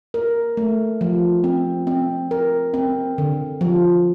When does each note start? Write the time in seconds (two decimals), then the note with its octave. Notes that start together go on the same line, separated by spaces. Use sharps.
0.14 A#4
0.57 A3
1.01 F3
1.44 C4
1.87 C4
2.31 A#4
2.74 C4
3.18 D3
3.61 F3